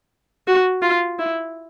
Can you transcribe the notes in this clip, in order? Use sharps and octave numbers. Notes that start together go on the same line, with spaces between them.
F#4
F4
E4